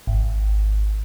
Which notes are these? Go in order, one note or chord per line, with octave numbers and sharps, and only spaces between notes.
G#1